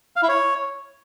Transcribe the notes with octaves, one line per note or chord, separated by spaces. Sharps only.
F5
E4
C#5